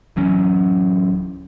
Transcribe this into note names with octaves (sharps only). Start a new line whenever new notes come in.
D1 E3 F#3 C#4